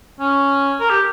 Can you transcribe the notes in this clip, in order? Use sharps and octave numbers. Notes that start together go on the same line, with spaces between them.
C#4
A#4
G4